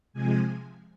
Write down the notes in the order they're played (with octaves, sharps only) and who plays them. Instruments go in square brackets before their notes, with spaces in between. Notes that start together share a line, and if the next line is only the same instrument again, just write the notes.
[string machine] C3 F3 G#3 G#5